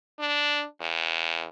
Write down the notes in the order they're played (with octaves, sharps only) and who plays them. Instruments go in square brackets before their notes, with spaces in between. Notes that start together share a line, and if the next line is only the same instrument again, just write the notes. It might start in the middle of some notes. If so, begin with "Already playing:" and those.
[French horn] D4
E2